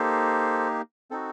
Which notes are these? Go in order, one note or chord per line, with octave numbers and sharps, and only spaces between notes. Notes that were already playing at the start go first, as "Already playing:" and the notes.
Already playing: A#3 D#4 G4 A4 C5
C4 D#4 F#4 A4